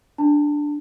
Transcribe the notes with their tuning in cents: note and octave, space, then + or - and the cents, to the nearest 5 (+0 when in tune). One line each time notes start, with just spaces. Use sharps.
D4 +0 A5 +30